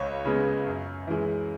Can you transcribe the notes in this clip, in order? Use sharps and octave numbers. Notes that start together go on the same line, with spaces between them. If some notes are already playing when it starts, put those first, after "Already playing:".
Already playing: C#2 C#5
C#3 G#3 B3
F#2
E3 G#3